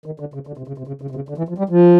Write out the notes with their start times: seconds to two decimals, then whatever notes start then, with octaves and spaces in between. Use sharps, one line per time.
0.06 D#3
0.20 D3
0.34 C#3
0.47 D3
0.57 C3
0.68 C#3
0.78 C3
0.87 C#3
1.02 C#3
1.10 C3
1.15 C#3
1.29 D3
1.38 E3
1.49 F3
1.58 G3
1.69 F3